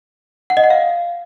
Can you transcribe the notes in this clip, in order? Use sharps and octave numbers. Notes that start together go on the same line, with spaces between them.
F#5
D#5
F#5
F5